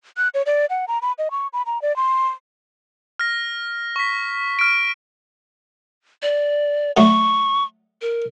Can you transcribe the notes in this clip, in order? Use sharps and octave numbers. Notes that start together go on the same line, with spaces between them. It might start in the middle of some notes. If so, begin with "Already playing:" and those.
F#6
C#5
D5
F#5
A#5
B5
D#5
C#6
B5
A#5
D5
C6
F6 A#6
C#6 B6
F6 D7
D5
D3 F#3 A3 C#6
A#4